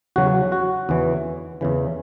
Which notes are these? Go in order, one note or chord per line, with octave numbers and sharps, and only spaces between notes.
E2 C#3 F#3 F#4
F#4
E2 C#3 E3
E2 C#3 E3